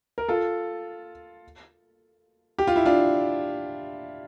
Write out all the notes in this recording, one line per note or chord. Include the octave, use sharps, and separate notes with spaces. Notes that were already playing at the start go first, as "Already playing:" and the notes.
A#4
F4 A4
G4
F4
E4
D4 F4